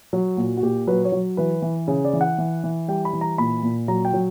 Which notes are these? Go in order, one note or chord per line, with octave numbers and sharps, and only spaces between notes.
F#3
A#2 F#4
F#4
A#2 G4
F#3 B4
C#5
F#3
E3 B4
E3
C#3
D5
E3
F#5
E3
E3
G3 G5
B5
E3
A#5
A#2 B5
A#2
F#3 A#5
G5
F#3